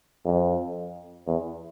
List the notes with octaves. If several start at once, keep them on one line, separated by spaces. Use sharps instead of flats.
F2
E2